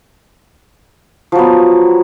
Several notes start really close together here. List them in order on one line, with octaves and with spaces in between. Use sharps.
F3 F#3 B3